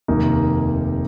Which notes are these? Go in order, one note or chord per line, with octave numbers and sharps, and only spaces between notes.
F1 D#2 D#3 A#3 D#4